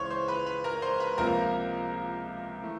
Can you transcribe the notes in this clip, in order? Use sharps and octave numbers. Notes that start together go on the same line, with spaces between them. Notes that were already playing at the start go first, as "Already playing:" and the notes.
Already playing: C#2 C#3 E3 C5 C#5 C6 C#6
C5 C6
B4 B5
B4 B5
A#4 A#5
C5 C6
B4 B5
C#2 C3 F3 A#3 A#4 A#5
E3 A3